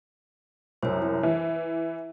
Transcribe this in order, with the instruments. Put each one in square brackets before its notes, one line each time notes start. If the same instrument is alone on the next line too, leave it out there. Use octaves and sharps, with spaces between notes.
[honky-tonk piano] C2 F#2 [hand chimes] C5 C#5
[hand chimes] E4
[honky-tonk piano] E3